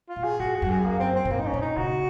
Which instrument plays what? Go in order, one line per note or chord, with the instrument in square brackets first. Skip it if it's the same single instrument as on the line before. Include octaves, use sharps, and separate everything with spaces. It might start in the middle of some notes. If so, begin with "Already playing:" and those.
[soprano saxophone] F4
[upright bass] A#2
[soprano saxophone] G#4
[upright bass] G#2 [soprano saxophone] F#4
[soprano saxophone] G#4
[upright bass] F#2 [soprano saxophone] F#4
[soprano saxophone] G#4
A#3
C4
C4
[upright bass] A#2
[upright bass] G#2 [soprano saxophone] A#3
[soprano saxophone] D#4
C#4
[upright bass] A#2
[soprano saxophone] D#4
[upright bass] C#3 [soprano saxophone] F#4